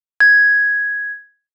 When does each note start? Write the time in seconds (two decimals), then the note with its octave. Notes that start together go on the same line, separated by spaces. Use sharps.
0.20 G#6